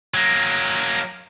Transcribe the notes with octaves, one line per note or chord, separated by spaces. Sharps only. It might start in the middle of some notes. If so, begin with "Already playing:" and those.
F#3 A#3